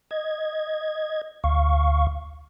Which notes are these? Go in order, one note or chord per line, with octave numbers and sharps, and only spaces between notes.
D#5 G#6
D2 F5 C#6